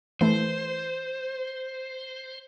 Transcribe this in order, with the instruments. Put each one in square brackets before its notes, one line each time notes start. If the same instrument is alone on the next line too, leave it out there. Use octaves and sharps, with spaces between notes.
[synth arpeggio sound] E3 A3 [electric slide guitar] C5